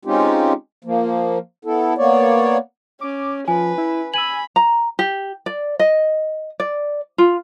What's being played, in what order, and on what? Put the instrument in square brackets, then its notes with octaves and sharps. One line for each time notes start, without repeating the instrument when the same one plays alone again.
[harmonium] G#3 C4 C#4 D#4 F4 G4
F3 A#3
B3 E4 A4
A#3 B3 C#5 D5
[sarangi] C#4 [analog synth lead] D6
[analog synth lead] F3 [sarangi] B4 [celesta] G#5
[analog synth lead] E4
[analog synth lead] G#5 [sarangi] B5 [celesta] E6 D#7 F#7
[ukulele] A#5
G4
D5
D#5
D5
F4